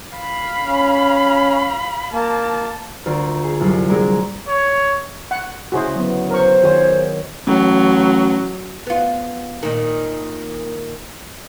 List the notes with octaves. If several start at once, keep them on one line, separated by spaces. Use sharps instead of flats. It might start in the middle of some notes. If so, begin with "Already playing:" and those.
F5 B5
C#4
A#3 A5
D2 F4 A#4 C6
G#4
C2 F#2 G3 C7
F#3 G#3 A#3 D4 G#4 A#4
C#5
F#5
D2 C#3 E4 F#4 G#4 C5
F#3 B3
A#4 C5 C#6
D#3 F4 G#4 C#5
A1 F#3
B3 F4
A#2 D#3